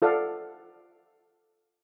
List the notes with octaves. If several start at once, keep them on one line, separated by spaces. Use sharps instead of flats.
F4 A4 D5 F5 F#5